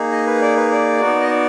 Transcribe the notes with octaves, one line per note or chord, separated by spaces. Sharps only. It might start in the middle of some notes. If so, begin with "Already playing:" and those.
Already playing: A#3 D#4 G#4
D#5
B4
D5
B4
D5
B3 D#4 F#4
D#5
D5